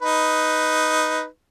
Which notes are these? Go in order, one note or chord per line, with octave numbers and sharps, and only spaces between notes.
D#4 B4